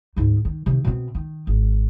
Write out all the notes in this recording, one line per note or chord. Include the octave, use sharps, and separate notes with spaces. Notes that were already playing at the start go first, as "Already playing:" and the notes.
D2 G#2
D#3
C3 D#3
B2 C4
D#3
G#1